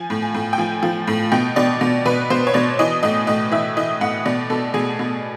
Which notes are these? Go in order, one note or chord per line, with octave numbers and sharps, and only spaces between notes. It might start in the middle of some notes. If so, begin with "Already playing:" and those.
Already playing: F3 G#5
A2
G#5
A2
G5
F3 G#5
F3
A2
B2 G5
B2 D5
B2
B2 B4
B2 C5
C#5
B2 D5
E3 D#5
A2 D#5
A2 D#5
E3 E5
E3 D#5
A2 F#5
B2 D5
B2 A4
B2 G#4
B2